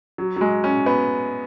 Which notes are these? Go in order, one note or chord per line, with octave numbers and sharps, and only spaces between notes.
F#3
F#3
G#3
C#4
B3